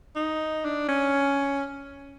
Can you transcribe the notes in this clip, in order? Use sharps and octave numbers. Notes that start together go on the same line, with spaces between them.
D#4
D4
C#4